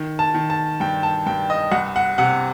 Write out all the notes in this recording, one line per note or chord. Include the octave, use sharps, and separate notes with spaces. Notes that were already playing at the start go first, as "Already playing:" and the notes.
Already playing: D#3
A5
D#3
A5
G2 G5
A5
G2 G5
D#5
C2 F#5
F#5
C3 F#5